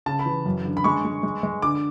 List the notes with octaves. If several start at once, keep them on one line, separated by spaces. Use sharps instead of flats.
C#3 A5
B5
E3
F#2
D3
B5
G#3 C#6
G#3
G#3
G#3
D3 D6